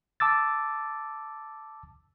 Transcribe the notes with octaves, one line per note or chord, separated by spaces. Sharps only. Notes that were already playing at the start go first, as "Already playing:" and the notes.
A5 D6 E6 A6